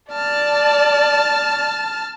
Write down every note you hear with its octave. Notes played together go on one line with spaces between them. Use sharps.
D5 A5 F6